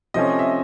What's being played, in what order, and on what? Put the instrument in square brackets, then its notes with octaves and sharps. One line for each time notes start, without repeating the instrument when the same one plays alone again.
[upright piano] C3 F3 A3 C#4 [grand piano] D#5
[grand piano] E5